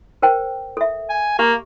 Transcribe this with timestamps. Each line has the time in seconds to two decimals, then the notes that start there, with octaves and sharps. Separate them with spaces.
0.22 A#4 C5 G5
0.77 A4 E5
1.10 G#5
1.39 A#3 G4